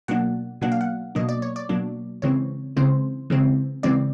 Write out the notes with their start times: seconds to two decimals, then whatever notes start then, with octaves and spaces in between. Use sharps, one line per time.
0.08 B2 F#3 A#3 D4 F#5
0.61 B2 F#3 A#3 D4 F#5
0.72 F5
0.81 F#5
1.15 B2 F#3 A#3 D4 D#5
1.29 D5
1.42 C#5
1.56 D5
1.69 B2 F#3 A#3 D4
2.22 C#3 E3 G#3 C4 C#5
2.76 C#3 E3 G#3 C4 C5
3.30 C#3 E3 G#3 C4
3.83 C#3 E3 G#3 C4 D5